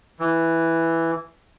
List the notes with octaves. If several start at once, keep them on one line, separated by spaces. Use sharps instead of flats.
E3